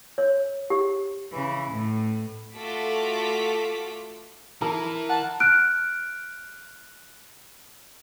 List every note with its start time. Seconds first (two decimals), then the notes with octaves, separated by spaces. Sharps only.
0.18 C#5
0.70 G4
1.32 C#3 E3
1.71 A2
2.57 A3 F4 F#4 A4 D6 B6
4.62 E3 E4 A#4
5.09 F#5 A5
5.40 F6 F#6 D7